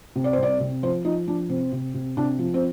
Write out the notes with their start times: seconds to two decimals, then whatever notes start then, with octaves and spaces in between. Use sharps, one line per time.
0.16 C3
0.24 D5
0.33 C5
0.38 C2 D5
0.60 C3
0.83 F3 C5
1.05 F3 D#4
1.28 F3 D4
1.49 C3 C4
1.72 C3
1.94 C3
2.17 C3 D4
2.39 F3
2.54 C4